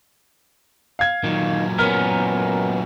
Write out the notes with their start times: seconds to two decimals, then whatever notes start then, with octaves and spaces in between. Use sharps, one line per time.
0.99 F5 G#6
1.24 A#2 D#3 F#3
1.78 B3 C#4 A#4 F6